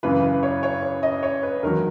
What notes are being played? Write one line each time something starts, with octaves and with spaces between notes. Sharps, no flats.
F#2 C#3 E3 B4
B4
C#5
C#5
C#5
D#5
C#5
B4
E2 D#3 F#3 A#4